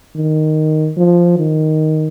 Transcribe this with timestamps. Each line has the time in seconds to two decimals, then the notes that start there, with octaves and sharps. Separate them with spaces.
0.16 D#3
0.97 F3
1.38 D#3